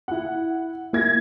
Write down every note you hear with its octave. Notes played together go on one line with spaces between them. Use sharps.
E4 F#5
A#3 E4 G#6 A#6